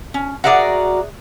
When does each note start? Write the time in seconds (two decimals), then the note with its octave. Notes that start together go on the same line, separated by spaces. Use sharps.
0.14 C#4
0.44 F#4 G#4 A#4 D5 E5 F#5